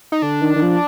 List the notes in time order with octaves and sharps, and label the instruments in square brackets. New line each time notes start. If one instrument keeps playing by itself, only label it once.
[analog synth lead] D#4
[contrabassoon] D3 [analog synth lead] D4
[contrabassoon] D#3
D#3
F3